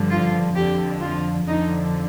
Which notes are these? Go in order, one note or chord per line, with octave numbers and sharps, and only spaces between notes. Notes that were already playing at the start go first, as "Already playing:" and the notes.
Already playing: G2 D3 F3
F4
F2 D3 F3 G4
F4
F2 D3 F3 D#4